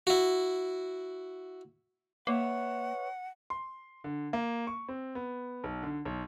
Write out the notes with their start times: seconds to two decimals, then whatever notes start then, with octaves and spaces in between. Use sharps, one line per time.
0.07 E4 F#4
2.27 A#3 B4 C#5 E5 F#5
3.50 C6
4.04 D3
4.33 A#3
4.67 C#6
4.89 C4
5.15 B3
5.64 B1
5.83 D3
6.05 B1